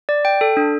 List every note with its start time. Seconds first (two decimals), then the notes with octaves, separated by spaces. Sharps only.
0.09 D5
0.25 G5
0.41 A4
0.57 D4